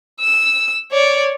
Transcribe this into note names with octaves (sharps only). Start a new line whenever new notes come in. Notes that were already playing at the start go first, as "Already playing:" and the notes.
E6
C#5 D5